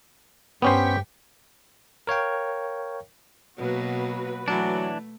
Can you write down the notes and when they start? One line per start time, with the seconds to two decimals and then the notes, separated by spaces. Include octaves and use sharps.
0.62 G2 B3 C#4 G4 C5 G5 C#6 B6
2.07 A#4 C#5 F5 G5
3.57 B2 F#3 A#3 F#4 B4
4.48 E3 F#3 A3 D4